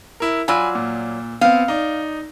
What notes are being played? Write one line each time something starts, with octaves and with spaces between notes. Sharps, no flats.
E4 A#4
F#3 F4 D5 G#5 B5 E6
A#2
B3 C4 F5
D#4 D5